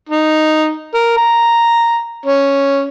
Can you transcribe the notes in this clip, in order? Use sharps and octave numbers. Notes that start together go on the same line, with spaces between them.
D#4
A#4
A#5
C#4